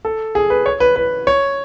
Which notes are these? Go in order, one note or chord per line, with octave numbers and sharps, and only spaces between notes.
A4
G#4
B4
C#5
B4
B4
C#5